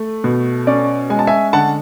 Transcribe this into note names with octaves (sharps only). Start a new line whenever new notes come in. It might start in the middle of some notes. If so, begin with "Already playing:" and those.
Already playing: A3
B2
C#4 D5
G#3 G#5
A5
E5 G#5
D3 F#5 A5